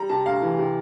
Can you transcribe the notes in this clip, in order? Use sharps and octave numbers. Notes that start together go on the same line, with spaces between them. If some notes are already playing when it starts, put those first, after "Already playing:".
Already playing: G3 A#5
C3 A5
D2 F5
E3
C3